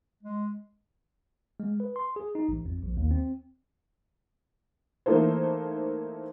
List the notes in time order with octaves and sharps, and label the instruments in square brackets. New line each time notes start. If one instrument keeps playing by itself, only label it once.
[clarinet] G#3
[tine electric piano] G#3
B4
C6
G#4
D#4
A1
F2
A#1
D#2
C4
[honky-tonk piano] E3 A3 A#3 D#4 A4 C5